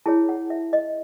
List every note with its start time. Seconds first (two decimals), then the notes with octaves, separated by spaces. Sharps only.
0.06 E4 G#4 C#5 A5
0.29 F#5
0.50 E5
0.73 D#5